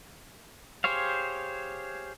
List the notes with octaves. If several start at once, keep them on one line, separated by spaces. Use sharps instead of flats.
G4 G#4 C5 C#5 F5